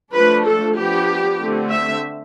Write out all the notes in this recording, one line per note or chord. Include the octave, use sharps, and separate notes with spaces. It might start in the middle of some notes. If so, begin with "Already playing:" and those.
F3 A3 D4 B4
A4
F3 B3 D4 G4
D3 A3 C4
E5